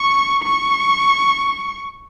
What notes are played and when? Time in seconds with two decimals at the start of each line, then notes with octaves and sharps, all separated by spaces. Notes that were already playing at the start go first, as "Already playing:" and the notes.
Already playing: C#6
0.43 C#6